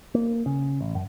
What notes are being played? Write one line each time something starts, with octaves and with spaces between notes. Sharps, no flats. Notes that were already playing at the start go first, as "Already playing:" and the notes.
A#3
C#3
A1
F#2